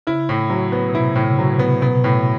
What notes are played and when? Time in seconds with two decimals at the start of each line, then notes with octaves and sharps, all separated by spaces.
0.07 C#3 E4
0.29 A2
0.50 F#3
0.72 B3
0.89 B2
0.94 C3 E4
1.15 A2
1.24 C#3
1.39 F#3
1.53 C3
1.59 B3
1.82 B2 B3
2.04 A2